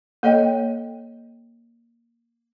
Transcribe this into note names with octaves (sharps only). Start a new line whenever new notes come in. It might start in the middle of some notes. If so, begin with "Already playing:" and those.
A#3 A4 C#5 D#5 G5